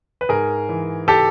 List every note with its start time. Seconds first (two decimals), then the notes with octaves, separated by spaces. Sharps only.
0.21 B4
0.29 G#2 G#4 A#4
0.69 E3
1.08 G4 A4